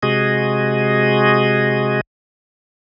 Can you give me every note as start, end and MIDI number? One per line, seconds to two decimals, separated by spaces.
0.03 2.01 48
0.03 2.01 56
0.03 2.01 66
0.03 2.01 68
0.03 2.01 75